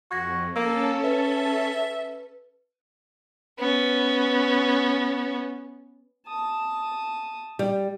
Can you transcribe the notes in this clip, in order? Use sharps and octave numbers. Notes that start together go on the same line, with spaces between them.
F2 F#4 C#6 G#6 A#6
A#3 C#4 A4 A5 E6
B4 E5
B3 C#4
A5 D#6
G3